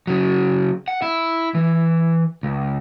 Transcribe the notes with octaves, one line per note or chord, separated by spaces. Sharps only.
C#3 F#3
F#5
E4
E3
C#2